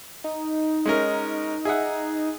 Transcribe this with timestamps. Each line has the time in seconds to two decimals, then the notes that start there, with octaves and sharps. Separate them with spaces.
0.24 D#4
0.86 G#3 C#4 A#4
1.65 G#4 E5 F#5